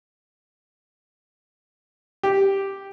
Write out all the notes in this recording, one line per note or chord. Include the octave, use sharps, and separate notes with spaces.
G4